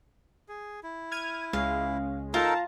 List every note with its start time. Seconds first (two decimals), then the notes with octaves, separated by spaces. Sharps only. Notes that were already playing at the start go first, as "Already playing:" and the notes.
0.49 G#4
0.83 E4
1.12 F6 G#6 D#7
1.53 C#2 G#3 C#4 F5
2.34 D#4 F4 A4 A#4 A5 A#5